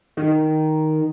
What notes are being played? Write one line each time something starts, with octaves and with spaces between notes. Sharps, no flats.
D#3